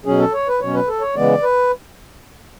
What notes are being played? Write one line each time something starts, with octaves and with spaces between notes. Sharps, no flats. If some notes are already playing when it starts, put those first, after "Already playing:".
B2 F#3 C#4 G#4
A4
C#5
B4
B2 F#3 C#4 C#5
B4
A4
C#5
C#3 E3 G#3 B3 D5
B4